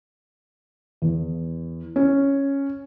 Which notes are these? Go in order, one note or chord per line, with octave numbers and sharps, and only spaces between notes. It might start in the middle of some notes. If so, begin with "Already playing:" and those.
E2
C#4